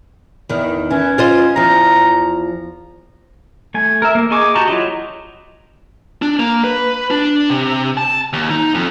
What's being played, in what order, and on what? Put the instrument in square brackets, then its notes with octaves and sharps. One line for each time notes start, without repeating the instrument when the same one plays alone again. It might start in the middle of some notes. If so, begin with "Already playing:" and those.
[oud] E2 D#3
[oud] E3 [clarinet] C#4
[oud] F4 C5 D#5
[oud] E2 F3 [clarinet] A#5
[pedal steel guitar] A3 G#5
A#4 E5
A#3
G#4 D#5 G#5 C#6 D6
F#4 G4 A5 A#5 C#6
F#3 E4 F4 G4 D#5
[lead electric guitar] D4
A#3
B4
D4
C3
A5
D#2
D#4
F2